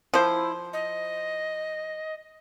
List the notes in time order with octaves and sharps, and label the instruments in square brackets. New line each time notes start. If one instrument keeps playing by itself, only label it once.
[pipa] F3 C5 [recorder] E4
[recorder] D#5